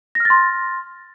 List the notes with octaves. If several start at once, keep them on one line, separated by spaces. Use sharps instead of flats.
C6 F6 A6 A#6